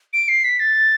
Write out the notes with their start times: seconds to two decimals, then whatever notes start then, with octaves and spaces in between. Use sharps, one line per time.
0.13 D7
0.28 C7
0.44 B6
0.60 A6